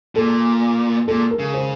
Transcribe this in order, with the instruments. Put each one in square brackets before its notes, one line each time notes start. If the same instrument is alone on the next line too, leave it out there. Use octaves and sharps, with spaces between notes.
[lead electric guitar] A#2 [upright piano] A4
[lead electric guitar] A#2 [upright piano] A4
[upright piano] A#4
[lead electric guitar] C#3
[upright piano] C5